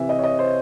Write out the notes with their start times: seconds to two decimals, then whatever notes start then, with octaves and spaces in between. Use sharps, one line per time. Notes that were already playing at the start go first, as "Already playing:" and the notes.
Already playing: C3 E3 E5
0.09 D#5
0.19 C#5
0.24 D#5
0.39 C5